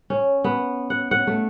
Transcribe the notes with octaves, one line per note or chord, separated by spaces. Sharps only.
C#4
B3
F#5
F#5
A3